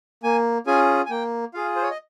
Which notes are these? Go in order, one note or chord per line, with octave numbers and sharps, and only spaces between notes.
A#3 G#5
C#4 F4 G#4 G#5
G#5
A#3 G5
F4 G#4 F5
C5
C#5
D#5